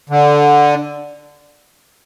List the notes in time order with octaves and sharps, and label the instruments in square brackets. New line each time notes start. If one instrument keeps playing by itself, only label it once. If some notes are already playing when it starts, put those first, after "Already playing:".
[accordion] D3